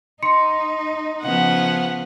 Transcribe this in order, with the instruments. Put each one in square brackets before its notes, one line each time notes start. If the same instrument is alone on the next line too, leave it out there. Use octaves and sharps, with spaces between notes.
[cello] D#4 [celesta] C6 C#7
[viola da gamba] C#3 F3 B3 [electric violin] F#5